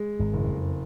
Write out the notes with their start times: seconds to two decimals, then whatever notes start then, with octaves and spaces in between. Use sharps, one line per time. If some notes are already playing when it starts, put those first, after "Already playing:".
Already playing: G#3
0.19 G#1 G#2
0.33 F#1
0.48 F2